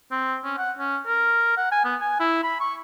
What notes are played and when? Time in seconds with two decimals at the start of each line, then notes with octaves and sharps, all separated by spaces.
0.11 C4
0.44 C#4
0.58 F#5
0.79 C#4
1.07 A#4
1.57 F#5
1.72 G#5
1.85 B3
2.01 G#5
2.20 E4
2.43 B5
2.60 C#6